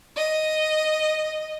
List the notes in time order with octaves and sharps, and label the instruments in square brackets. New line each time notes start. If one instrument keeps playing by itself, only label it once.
[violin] D#5